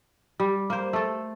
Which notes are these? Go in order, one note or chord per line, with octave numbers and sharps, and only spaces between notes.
G3
A#3 C5
A3 A4